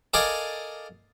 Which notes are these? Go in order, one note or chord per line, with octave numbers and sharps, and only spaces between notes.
A4 A#4 D5 D#5 F5 G#5